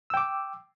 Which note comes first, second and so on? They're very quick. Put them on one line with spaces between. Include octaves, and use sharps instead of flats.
E6 G5 D6